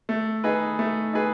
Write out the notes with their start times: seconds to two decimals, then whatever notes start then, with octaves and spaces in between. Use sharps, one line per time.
0.09 A3
0.44 D#4 G#4 B4
0.79 A3
1.13 D#4 G#4 B4